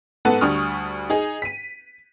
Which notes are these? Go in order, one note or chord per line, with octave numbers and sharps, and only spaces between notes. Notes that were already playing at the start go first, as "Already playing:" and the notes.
G#2 B3 A4 F#5
D2 G3 D4 C#6 D#6 F6
D#4 G#4
B6 D#7